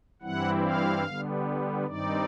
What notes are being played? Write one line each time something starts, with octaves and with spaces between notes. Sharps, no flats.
G2 E3 G3 C4 E4 F#5
F5
D3 G3 B3
G2 D#3 G3 C4 D#4 D5